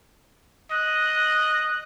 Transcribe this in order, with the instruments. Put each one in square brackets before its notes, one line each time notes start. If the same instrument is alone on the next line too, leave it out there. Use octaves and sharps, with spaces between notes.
[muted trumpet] D#5 [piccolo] F#6